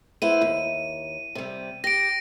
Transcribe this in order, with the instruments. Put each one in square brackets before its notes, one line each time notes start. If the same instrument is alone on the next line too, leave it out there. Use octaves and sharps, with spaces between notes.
[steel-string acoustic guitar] B3 E4 C5 [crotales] D#7
[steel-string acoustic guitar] D#2
C3 G3
[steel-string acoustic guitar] G4 [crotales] A#6 D7